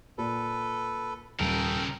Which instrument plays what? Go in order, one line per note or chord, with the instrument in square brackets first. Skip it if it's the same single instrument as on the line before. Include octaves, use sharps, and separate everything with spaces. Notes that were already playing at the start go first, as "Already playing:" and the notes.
[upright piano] A#2 [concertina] A4 B4
[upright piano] D#1 [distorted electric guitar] C#3 A#4 [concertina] A4 G5